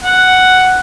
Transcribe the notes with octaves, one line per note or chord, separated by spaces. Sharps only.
F#5